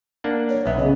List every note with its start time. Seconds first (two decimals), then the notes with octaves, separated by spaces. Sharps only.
0.24 A#3 D4 F#5
0.49 C#5
0.66 B1 B3 E5
0.78 C#3 D#5